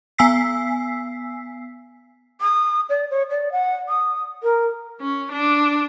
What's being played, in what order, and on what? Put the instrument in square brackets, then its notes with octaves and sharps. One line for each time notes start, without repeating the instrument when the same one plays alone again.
[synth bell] B3 G#5 E6 B6 C7
[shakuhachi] D#6
D5
C#5
D5
F#5
D#6
A#4
[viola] C#4
D4